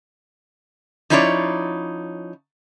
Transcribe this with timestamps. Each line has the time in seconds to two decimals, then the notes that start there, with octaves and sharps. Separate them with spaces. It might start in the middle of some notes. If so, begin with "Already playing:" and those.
1.10 F3 C#4 D#4 E4 C#5 D5